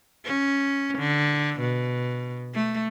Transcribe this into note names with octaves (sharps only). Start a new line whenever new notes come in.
C#4
D3
B2
A3